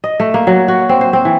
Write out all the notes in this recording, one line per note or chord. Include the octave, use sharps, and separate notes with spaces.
D#5
A3
A#3
F#3
F#4
C4
C5
C4
E3